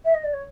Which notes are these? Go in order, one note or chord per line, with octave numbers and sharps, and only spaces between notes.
E5
D#5
D5
C#5